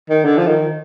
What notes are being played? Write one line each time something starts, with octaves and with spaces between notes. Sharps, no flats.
D#3
D3
F3
D#3